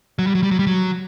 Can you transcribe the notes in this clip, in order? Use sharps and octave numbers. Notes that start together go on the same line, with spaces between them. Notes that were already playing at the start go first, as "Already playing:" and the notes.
F#3
G3
F#3
G3
F#3
G3
F#3